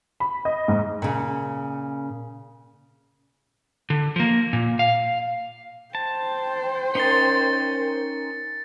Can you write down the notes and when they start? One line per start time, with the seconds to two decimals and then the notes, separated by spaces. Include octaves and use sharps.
0.20 B5
0.45 D#5
0.68 G#2
1.02 A#2 C#3
3.90 D3
4.16 F3 A#3
4.53 A#2
4.79 F5
5.95 C5 G5 A5
6.95 C#4 D#4 A#4 C6 A6 C#7